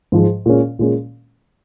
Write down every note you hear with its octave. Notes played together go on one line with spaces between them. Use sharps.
G#2 F3 G#3
A#2 G#3 C#4
A#2 G#3 C#4